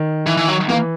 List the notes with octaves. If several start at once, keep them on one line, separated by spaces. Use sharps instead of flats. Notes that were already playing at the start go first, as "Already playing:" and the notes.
Already playing: D#3
E3
E3
F#3
E3 A#3